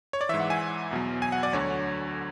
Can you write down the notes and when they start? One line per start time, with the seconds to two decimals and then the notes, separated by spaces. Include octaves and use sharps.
0.13 C#5
0.21 D5
0.29 E3 E5
0.34 G#2
0.40 F#5
0.50 G#5
0.91 E2 B2 F#3
1.22 G#5
1.32 F#5
1.43 D5
1.53 D2 D3 F#3 C#5